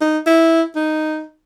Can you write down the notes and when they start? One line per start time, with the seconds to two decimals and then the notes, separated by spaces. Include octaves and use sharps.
0.01 D#4
0.27 E4
0.76 D#4